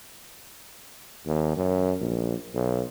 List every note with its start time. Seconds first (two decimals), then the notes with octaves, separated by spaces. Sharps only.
1.26 D#2
1.57 F#2
2.01 A#1
2.54 B1